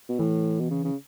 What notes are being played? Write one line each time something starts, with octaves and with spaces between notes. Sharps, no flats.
B2
A2 E3
B2
C#3
C#3